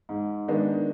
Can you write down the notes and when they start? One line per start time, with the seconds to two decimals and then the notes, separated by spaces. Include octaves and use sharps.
0.09 G#2
0.48 D#3 G#3 B3 D4